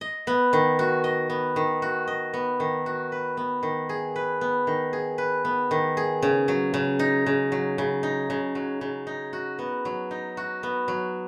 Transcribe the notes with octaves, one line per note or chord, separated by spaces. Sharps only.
D#5
B3
D#3
F#4
D#5
B3
D#3
F#4
D#5
B3
D#3
F#4
B4
B3
D#3
G#4
B4
B3
D#3
G#4
B4
B3
D#3
G#4
C#3
F#3
C#3
D#4
C#3
F#3
C#3
D#4
C#3
F#3
C#3
D#4
F#4
B3
F#3
D#4
F#4
B3
F#3